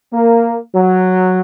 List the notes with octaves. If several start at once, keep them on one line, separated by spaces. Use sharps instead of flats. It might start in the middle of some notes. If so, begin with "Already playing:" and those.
A#3
F#3